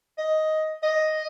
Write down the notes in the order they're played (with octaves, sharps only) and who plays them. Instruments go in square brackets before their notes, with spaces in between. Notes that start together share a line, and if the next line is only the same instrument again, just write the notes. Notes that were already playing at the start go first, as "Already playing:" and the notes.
[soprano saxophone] D#5
D#5